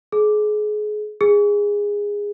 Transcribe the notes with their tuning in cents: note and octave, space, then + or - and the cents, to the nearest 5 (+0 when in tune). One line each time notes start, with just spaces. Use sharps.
G#4 +30
G#4 -15